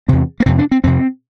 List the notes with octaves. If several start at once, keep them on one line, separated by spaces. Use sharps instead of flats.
E2 C3 C4
A#3
F2 C3 C4
D4
C4
F2 C3 C4